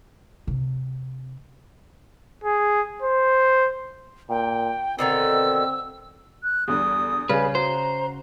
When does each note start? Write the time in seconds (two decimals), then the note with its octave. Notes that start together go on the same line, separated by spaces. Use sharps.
0.47 C3
2.44 G#4
3.02 C5
4.29 A#2 G5
4.99 B2 D3 D#3 C4 E6
6.43 F#6
6.68 E2 D3 G3 D#6
7.29 C#3 G3 G#4 B4
7.55 F#4 C5 A#5